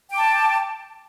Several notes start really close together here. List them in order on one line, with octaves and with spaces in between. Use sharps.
G5 D6 A5